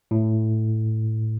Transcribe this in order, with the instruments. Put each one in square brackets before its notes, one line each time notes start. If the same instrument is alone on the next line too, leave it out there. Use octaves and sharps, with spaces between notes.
[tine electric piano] A2